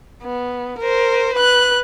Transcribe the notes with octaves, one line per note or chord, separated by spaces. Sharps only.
B3
A#4 C5
B4 F#6